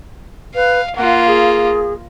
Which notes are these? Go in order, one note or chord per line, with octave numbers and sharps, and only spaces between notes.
B4 F5
A#3 F4 F#5
G#4